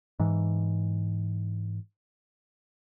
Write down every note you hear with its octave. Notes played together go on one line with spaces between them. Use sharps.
G#2 E3